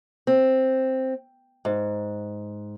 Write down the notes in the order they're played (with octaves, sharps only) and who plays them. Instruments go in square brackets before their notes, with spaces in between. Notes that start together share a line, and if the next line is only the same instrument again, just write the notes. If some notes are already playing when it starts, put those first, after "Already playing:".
[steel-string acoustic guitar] C4
G#2